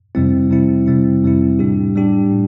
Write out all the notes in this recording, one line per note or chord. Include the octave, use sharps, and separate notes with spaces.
F2 C3 G3 C4 E4
F2 C3 G3 C4 E4
F2 C3 G3 C4 E4
F2 C3 G3 C4 E4
A2 G3 D4 G4
A2 G3 D4 G4
A2